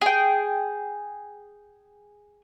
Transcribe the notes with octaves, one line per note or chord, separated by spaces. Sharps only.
G#4 G5